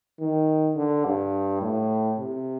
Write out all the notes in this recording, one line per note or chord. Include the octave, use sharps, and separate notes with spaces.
D#3
D3
G2
A2
C3